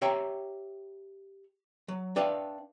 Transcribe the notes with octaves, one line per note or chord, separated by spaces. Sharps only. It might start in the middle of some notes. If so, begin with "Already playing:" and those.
G4 C#5 E5 G5 A#5
F#3
D4 B4 D5 E5 F5 G5